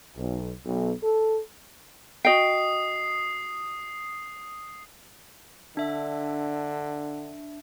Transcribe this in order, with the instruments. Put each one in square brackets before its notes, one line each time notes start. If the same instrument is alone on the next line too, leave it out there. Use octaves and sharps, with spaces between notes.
[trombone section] B1
B1
A4
[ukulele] F#4 D#5 G5 [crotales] D#6 C7
[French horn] D3 [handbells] D4 E5